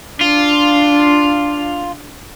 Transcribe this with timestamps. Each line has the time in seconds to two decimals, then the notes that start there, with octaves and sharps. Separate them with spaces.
0.21 D4 F4